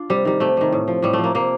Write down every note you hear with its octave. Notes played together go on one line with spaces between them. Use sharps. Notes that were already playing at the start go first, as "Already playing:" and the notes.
Already playing: D4 F4
C3 G3
D#3 G3
C3 A3
D#3 G3
A2
F3
A2 G3
F3 A3
A#3
C3 A#3